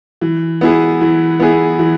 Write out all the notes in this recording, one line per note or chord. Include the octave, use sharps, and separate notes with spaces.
E3
B3 E4 G#4
E3
B3 E4 G#4
E3